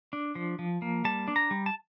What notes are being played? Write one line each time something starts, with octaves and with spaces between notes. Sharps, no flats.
D4
F3
F3
A#3
G3 A5
D4
A#5
G3
A5